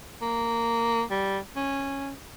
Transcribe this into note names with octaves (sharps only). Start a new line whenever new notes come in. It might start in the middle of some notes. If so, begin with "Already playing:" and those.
A#3
G3
C#4